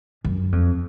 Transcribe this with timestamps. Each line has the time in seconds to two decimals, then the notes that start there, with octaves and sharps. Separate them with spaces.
0.24 F#2
0.52 F2